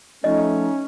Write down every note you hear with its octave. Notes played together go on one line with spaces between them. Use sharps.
F3 A3 C#4 D#4 D#5